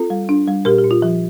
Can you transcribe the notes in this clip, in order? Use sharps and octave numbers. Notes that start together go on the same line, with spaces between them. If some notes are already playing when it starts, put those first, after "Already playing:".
Already playing: C4 F4 A4
G3
D4
G3
A#2 G4 A#4
G4
A#2
F4
F3